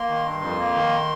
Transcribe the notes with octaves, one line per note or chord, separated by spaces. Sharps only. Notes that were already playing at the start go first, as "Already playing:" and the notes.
Already playing: A#3 C6
D#3
G2
F2
A#3
D#3